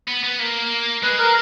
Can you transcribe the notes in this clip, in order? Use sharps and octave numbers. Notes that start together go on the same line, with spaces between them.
B3
B3
A#3
G#3 B4
A#4